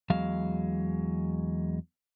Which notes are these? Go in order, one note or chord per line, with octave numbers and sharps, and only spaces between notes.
E2 F#3 G#3 F5